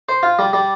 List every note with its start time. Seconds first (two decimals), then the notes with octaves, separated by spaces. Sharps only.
0.09 C5
0.23 F4
0.39 G3
0.53 G3